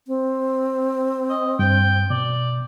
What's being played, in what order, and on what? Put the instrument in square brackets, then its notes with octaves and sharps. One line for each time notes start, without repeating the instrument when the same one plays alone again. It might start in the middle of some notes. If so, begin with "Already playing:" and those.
[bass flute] C4
[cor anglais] D#5
[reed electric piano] G2 [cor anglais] G5
[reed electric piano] B2 [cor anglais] D5